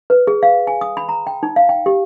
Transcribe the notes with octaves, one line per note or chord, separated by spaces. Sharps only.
B4
G#4
F5
G#5
D#6
B5
A#5
G5
D#4
F5
G5
G4